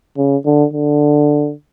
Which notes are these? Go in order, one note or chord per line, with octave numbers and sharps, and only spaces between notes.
C#3
D3
D3